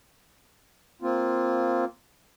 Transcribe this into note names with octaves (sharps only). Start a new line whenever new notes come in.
A#3 C4 F4